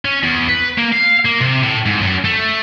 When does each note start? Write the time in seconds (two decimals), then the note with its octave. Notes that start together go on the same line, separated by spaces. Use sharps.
0.05 C#4
0.23 E2
0.49 B4
0.78 A#3
0.93 F5
1.26 A#3
1.42 C3
1.64 A2
1.86 G#2
2.01 F#2
2.25 A3